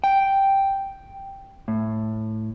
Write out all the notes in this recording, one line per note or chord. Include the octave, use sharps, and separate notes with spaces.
G5
A2